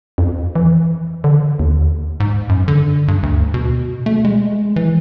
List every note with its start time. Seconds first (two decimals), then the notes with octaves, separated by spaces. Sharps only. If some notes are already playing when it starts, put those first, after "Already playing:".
0.18 F2
0.55 E3
1.24 D3
1.59 D#2
2.20 G#2
2.49 F#2
2.68 D3
3.08 G2
3.23 D2
3.54 B2
4.06 A3
4.25 G#3
4.76 E3